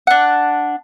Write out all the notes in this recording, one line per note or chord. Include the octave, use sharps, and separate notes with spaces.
D4 F#5